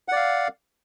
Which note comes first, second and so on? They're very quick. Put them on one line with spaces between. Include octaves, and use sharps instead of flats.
F#5 D5 F5